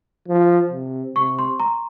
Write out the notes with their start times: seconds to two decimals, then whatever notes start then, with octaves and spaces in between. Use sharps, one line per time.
0.28 F3
0.73 C3
1.16 C3 C#6
1.39 C6
1.60 A#5